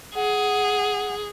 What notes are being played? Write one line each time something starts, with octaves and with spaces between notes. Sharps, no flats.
G#4 F#5